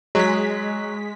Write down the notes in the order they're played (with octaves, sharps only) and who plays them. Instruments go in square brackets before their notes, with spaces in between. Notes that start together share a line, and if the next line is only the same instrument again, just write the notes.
[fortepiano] F#3 [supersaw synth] G#3 B6